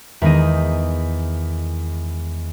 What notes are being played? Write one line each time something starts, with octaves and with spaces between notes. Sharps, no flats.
E2 D#3 G#3 D#4 D#5 D#7